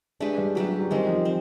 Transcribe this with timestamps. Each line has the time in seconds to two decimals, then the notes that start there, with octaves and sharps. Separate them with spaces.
0.20 G#3 A3 D4 G4 B4
0.38 G3
0.55 F#3 A3 D4 G4 B4
0.67 F#3
0.79 F#3
0.91 D#3 G3 G#3 C4
1.08 F3
1.25 C4